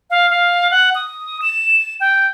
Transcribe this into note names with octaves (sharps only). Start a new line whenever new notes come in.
F5
F5
F#5
D#6
E7
G5